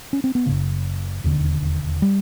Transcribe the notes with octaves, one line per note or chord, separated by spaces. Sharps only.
C#4
C4
B3
F#1 F#2 C#3 A#3
E1 D#2 D3
G3